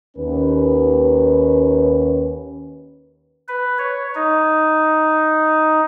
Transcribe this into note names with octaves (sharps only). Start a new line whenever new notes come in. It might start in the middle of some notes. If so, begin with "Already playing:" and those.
D#2 C#4 B4
B4
C#5
D#4